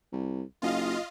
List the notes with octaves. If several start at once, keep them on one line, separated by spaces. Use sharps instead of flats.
C2
F#1 F4 D#5 F5